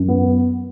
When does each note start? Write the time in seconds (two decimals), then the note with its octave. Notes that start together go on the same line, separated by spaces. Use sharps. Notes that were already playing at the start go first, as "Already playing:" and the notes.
Already playing: F#2
0.09 B3